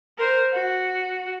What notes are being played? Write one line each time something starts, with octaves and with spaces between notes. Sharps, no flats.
A#4 C5
F#4